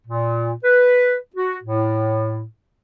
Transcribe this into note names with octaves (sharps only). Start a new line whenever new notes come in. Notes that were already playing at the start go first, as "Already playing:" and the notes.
A#2
B4
F#4
A2